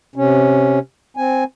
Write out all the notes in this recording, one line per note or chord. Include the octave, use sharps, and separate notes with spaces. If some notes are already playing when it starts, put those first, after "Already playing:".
C3 C#4
C4 G#5